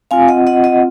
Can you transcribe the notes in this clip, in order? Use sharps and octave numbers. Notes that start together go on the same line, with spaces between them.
C4 F4 F5 G#5
D#5 F#5
D#5 F#5
D#5 F#5